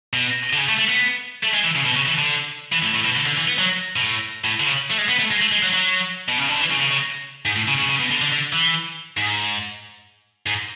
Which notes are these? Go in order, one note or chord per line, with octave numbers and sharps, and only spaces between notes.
B2
D3
C#3
A3
A3
B3
A3
G#3
E3
C#3
B2
C#3
E3
D3
E3
A2
A2
B2
D3
D3
E3
B3
F#3
B2
A2
A2
D3
C#3
A3
G#3
B3
A3
G#3
A3
G#3
F#3
F#3
B2
C#3
D3
E3
C#3
C#3
C#3
G#2
A2
C#3
C#3
C#3
B2
D3
D3
D3
E3
G#2
G#2